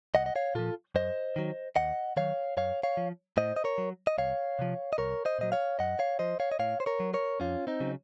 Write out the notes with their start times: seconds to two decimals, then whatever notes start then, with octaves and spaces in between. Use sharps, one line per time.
0.15 C2 D#5 F#5
0.26 D#5
0.36 C#5 F5
0.55 A#2 F3 F4 A4
0.95 F#2 C5 D#5
1.36 D#3 F#3
1.76 D#2 D#5 F#5
2.17 D#3 F#3 C#5 F5
2.57 F#2 C#5 F5
2.83 C#5 F5
2.97 F3
3.37 A2 C5 D#5
3.56 D#5
3.64 A#4 C#5
3.78 F#3
4.07 D#5
4.18 C2 C#5 F5
4.59 C3 F3
4.93 D#5
4.98 C2 A#4 C#5
5.25 C5 D#5
5.39 A#2 F#3 D#5
5.52 C#5 F5
5.79 F#2 D#5 F#5
5.99 C#5 F5
6.19 F3 C5 D#5
6.40 C#5 F5
6.52 D#5
6.59 A2 C#5 F5
6.80 C5
6.86 A#4 C#5
7.00 F#3
7.14 A#4 C#5
7.40 F2 C#4 F4
7.67 C4 D#4
7.80 C#3 F#3